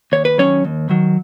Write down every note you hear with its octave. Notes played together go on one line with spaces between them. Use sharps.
D#2 C#5
B4
D#3 F#3 C#4 C#5
D#2
D#3 F#3